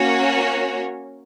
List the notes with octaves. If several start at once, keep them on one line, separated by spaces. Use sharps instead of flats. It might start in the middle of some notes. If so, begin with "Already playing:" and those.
Already playing: A#3 C#4 F#4 C#5